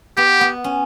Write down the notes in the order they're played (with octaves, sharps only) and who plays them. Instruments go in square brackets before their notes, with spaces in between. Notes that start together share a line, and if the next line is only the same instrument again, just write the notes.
[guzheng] B3 [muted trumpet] G4
[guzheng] B3
C#4